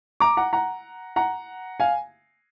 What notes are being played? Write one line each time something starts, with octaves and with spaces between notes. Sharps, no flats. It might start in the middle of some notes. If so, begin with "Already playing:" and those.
A#5 D6
F#5 A#5
F#5 A#5
F#5 A#5
F5 G#5